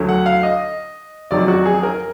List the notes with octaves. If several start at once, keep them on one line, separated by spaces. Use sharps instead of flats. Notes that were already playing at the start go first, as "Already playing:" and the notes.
Already playing: D2 D3 F#3
F#5
F5
D#5
F1 F2 D#3 F#3 D5
F#4
G#4
A#4